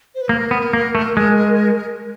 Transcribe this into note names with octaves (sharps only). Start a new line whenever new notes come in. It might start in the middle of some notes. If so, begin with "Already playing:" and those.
C5
B4
A#3 A#4
B3
A#3
A3
G#3